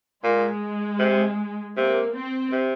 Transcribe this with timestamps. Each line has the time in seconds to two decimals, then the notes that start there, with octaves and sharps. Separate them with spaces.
0.23 A#2 G#3
0.99 C3
1.77 C3 A#3
2.15 C4
2.52 C3